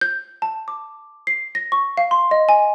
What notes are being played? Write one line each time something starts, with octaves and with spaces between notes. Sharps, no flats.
G6
A5
D6
C7
A#6
C#6
F5
C6
D#5
G#5